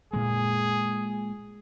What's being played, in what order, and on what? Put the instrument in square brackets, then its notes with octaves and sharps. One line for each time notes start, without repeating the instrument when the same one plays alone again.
[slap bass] A#2 G#3 [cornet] G#4